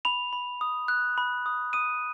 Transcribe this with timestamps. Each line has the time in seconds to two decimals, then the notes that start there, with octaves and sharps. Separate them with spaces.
0.05 B5 F7
0.33 B5
0.61 D#6
0.88 F#6
1.18 B5
1.46 D#6
1.73 D#6 D#7